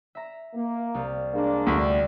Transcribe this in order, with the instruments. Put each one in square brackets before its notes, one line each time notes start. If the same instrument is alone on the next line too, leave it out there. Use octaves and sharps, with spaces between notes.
[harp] E5 A#5
[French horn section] A#3
[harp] C2 F5
[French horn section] G#3 A#3 D4
[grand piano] D2 [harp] G3 F4 D5